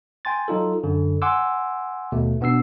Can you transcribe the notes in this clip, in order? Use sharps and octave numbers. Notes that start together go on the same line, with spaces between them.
G5 G#5 C6 A6
F#3 D#4 F4 A4
F#2 D3
F#5 G#5 C6 D6 E6
D#2 B2 A3
B2 B3 D4 E6 C7